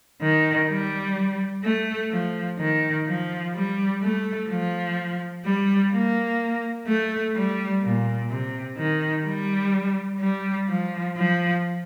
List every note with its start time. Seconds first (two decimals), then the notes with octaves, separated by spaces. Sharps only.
0.22 D#3
0.69 G3
1.64 A3
2.12 F3
2.59 D#3
3.07 F3
3.55 G3
4.03 A3
4.50 F3
5.46 G3
5.92 A#3
6.87 A3
7.35 G3
7.83 A#2
8.30 C3
8.78 D#3
9.26 G3
10.21 G3
10.69 F3
11.17 F3